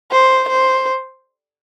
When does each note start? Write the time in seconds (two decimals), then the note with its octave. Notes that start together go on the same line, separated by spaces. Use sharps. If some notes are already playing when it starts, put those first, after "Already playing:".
0.12 C5
0.49 C5